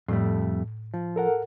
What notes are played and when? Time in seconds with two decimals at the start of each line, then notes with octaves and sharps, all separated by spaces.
0.09 F2 A2 G3 A3
0.94 F3
1.16 A4 A#4 F#5